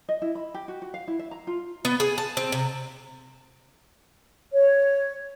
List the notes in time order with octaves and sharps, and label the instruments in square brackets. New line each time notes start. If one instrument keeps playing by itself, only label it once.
[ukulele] D#5
E4
B5
G4
F#4
F#4
F5
E4
E5
A#5
F4
[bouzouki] B3
G#4
A5
C4
C3
[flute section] C#5